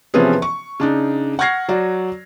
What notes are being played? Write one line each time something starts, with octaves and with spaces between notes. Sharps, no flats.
C3 E3 F3 B3 C#4 G#4
C#6
C#3 D4 D#4
F#5 C#6 F6 G#6 A#6 C7
F#3 F#4 D5